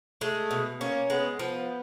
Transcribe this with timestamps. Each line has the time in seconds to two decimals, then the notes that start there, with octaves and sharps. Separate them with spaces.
0.21 G#3 A3
0.51 B2
0.80 A#3 C#4
1.10 G#3 B3
1.39 F3 B3